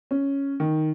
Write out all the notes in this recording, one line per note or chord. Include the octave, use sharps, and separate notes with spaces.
C#4
D#3